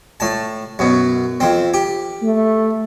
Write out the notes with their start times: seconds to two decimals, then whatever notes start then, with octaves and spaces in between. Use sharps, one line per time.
0.20 A2 A5
0.79 F#2 B2
1.40 F2 C4
1.74 G4
2.23 A3